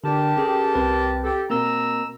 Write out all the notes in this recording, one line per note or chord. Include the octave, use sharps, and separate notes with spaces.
D3 D4 G4 A#4 A5
C#4 G#4 A4
C2 C4 B4
G4 A4
B2 A#3 C4 A#4 A#5 E6